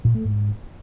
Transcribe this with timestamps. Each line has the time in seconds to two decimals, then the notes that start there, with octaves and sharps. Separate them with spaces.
0.05 A#2
0.15 A3
0.25 G#2